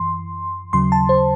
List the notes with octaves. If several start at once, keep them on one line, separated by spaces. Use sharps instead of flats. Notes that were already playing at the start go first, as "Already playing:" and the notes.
Already playing: F#2 E3 C6
D#2 C#3 F#3 C6
A5
C5